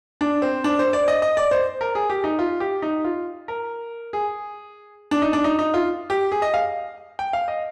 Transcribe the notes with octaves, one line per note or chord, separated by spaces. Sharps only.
D4
C4
D4
C5
D5
D#5
D#5
D5
C5
A#4
G#4
G4
D#4
F4
G4
D#4
F4
A#4
G#4
D4
D#4
D4
D#4
D#4
F4
G4
G#4
D#5
F5
G5
F5
D#5